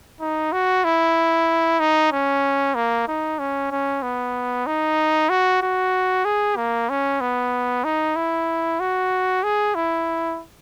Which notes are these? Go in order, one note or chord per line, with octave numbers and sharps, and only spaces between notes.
D#4
F#4
E4
D#4
C#4
A#3
D#4
C#4
C#4
B3
D#4
F#4
F#4
G#4
A#3
C#4
B3
D#4
E4
F#4
G#4
E4